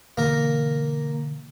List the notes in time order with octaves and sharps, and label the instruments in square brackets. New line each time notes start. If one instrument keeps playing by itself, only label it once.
[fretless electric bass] B2 D3 E3 [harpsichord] A#3 A#4